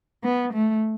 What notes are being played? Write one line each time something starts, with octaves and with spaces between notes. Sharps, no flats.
B3
A3